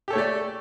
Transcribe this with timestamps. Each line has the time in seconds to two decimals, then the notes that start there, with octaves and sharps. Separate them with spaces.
0.08 G4
0.10 A4
0.13 C#5
0.15 A3
0.18 D5